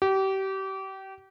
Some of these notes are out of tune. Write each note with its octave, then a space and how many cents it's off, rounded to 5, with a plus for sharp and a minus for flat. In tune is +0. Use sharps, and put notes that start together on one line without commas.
G4 -30